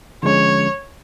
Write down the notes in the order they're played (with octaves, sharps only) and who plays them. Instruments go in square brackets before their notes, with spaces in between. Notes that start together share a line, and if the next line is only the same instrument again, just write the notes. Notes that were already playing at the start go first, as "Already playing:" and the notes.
[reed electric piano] D3 F3 G#3 C#4 [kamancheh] C#5